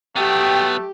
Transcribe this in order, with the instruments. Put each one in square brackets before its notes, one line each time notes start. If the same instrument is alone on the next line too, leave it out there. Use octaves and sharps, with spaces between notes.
[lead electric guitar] F#3 B3 [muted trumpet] A3 [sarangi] G4 [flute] G5